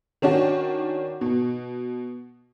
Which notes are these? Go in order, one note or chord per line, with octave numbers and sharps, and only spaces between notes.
D#3 C#4 D4 F#4
B2